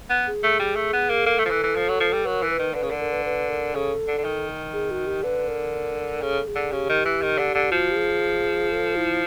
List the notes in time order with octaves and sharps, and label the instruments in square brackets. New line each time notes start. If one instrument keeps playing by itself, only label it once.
[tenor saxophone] B3
[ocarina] G#4
[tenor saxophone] A3
G3
A3
B3
A#3
[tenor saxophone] A#3 [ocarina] A4
[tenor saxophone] A3
F3
E3
E3
F3
F#3
F3
G3
[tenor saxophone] F#3 [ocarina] A#4 B4
[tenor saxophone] E3
[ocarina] B4
[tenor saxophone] D#3
[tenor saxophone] D3 [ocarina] B4
[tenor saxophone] C#3
[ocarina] A#4
[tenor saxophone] D3
[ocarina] A#4
B4
B4
A#4
[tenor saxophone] C#3 [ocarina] A4
[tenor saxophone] D3
D3
D#3
[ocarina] G#4
F#4
G4
[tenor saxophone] D3 [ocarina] B4
[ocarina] A#4
[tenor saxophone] C#3 [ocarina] A4
[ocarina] G#4
[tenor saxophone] D3
[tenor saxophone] C#3 [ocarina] G4
[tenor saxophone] D#3
E3
D#3
D3
D3
[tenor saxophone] F3 [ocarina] F#4
[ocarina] G4
G#4
A4
E4